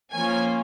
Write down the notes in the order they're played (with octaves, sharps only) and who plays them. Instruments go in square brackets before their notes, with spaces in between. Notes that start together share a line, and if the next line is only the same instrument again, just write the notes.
[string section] F3 A#3 C#4 F4 G#5